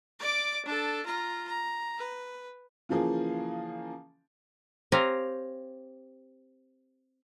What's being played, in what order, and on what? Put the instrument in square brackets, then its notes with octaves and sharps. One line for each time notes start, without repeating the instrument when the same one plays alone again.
[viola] D5 D6
D4 A4
F4 A#5
A#5
B4
[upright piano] C#3 E3 F3 A#3 G#4
[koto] C4 G4 C#5 F5 G#5 A#5